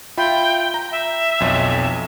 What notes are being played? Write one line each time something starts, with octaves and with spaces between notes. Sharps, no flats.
F4 E5 G5 B5
A#5
E5
B1 F2